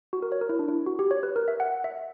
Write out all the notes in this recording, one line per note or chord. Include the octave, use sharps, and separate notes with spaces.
F#4
A#4
C#5
A#4
E4
D4
E4
F#4
G4
C#5
B4
A#4
E5
F#5
E5